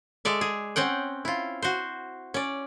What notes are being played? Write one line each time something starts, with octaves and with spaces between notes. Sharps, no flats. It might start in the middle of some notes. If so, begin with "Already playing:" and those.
G#3 A4 D5 E5
G#4
C4 C#4 F#5 G5
E4 F4
F#4 C5
C#4 D5